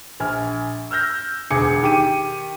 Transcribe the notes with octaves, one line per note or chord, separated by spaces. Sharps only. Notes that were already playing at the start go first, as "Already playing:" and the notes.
A#1 G#5 F6
E6 F6 G6 A#6
E1 D2 G#4 G#5 D6 C#7
D#3 G4 D6 D#7